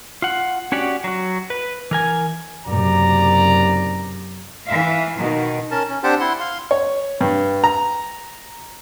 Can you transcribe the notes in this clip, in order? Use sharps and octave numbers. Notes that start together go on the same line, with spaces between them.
F4 F#5
C#4 F#4 G4 D5 F#5
F#3 F#4
B4
E3 A#4 G#5
F#1 F#2 C3 D5 A#5
E3 E5 F5
B2 D#3
C#4 A#4 A5
C#4
C4 D4 G4 C5 F#5 A5
E4 F#5 C6
F5 C6
C#5
G2
A#5